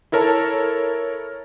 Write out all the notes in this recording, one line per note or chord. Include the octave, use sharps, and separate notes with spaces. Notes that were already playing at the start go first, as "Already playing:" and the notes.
E4 A4 A#4 C#5 A5